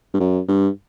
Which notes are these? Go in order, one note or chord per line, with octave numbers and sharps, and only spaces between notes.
G2
F#2
G2